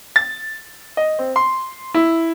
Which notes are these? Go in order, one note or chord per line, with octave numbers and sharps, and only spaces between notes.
A6
D#5
C4
C6
E4